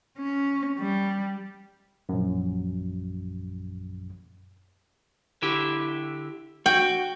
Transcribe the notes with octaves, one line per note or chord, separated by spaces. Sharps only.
C#4
G3
A#1 F#2
D3 E4 G4
F#4 G5